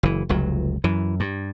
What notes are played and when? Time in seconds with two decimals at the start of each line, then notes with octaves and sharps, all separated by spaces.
0.03 F#1 E3
0.29 F1 C#2 F#3
0.84 F#2 E3
1.20 G2